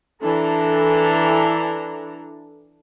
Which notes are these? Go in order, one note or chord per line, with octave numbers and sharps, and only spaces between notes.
E3 D4 A4 A#5